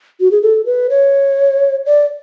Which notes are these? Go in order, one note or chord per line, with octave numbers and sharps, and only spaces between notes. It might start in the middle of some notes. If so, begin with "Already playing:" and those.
F#4
G#4
A4
B4
C#5
D5